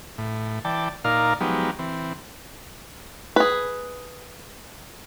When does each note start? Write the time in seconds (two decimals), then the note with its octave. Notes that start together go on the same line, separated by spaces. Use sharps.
0.18 A2
0.65 E3 D5 G5 A5
1.05 A#2 D#4 A#4 D5 F5 F6
1.41 F3 F#3 G#3 B3 D#4 G4
1.79 E3 C4
3.36 G#4 B4